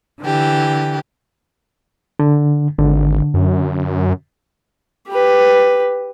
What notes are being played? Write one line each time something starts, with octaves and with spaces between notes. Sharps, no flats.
D3 E3 G4
D3
G#1 D3
F#2
G4 B4